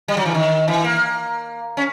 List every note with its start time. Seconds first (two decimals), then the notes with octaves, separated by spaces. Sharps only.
0.08 G3
0.17 F#3
0.25 E3
0.34 D#3
0.68 E3
0.84 A#3
1.77 C#4